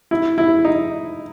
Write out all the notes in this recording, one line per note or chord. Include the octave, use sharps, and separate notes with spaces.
E4
E4
D#4